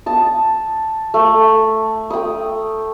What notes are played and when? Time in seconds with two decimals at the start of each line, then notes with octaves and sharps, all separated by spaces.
0.06 A5 D#6
1.14 A3
2.10 G5 D#6